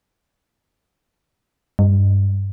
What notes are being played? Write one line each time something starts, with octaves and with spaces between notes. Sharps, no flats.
G2